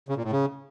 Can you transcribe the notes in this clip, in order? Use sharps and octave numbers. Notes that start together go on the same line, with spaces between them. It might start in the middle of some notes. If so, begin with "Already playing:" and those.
C#3
A#2
A2
C#3